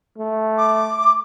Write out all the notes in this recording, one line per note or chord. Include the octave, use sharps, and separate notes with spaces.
A3
D6